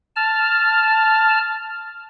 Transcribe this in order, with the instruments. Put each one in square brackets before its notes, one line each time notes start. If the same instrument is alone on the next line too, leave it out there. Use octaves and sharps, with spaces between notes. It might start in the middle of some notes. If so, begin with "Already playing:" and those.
[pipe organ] A5 F6